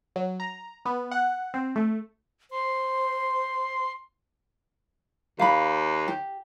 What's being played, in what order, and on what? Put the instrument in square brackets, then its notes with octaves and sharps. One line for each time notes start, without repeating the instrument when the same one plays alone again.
[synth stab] F#3
A#5
B3
F#5
C4
A3
[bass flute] C5 [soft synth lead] C6
[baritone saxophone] D#2 [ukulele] F5 B5
[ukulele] G4